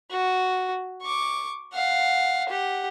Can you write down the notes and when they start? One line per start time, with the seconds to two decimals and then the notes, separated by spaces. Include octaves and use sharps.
0.11 F#4
1.02 C#6 D6
1.74 F5 F#5
2.49 G4 F#5